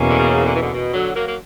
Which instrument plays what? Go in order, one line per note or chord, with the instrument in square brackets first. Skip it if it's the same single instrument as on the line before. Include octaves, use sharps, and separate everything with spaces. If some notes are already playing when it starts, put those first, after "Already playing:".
Already playing: [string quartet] E2 B2 A#3 C#4
[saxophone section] D3
C#3
D3
E3
B2 D3
B2
D3 F#3
F#3 A#3
A#3